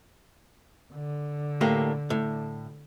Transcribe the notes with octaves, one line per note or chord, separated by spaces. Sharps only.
D3
A2 A#3 G4
A2